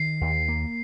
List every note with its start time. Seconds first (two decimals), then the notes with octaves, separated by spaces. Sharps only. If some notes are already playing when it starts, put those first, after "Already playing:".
Already playing: D#3 C7
0.21 D#2
0.48 A#3